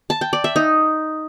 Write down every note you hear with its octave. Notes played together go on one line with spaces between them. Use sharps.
A5
G5
D5
E5
D#4